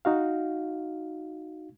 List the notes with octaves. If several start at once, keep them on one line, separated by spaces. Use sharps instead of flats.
D#4 F#4 F5